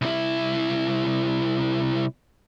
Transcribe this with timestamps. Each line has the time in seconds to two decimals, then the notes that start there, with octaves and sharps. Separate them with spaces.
0.02 C2 E4